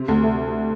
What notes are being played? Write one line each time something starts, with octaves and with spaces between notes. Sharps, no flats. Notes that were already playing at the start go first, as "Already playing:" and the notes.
Already playing: C3
D2
A3